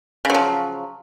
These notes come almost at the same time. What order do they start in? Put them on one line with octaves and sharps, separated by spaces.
C#3 F#3 F3